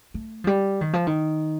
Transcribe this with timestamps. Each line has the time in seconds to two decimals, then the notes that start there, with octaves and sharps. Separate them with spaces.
0.14 A3
0.44 F3
0.47 G3
0.81 D#3
0.93 F3
1.07 D#3